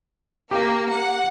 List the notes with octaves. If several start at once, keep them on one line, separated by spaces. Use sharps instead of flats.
A#3 G4
F#5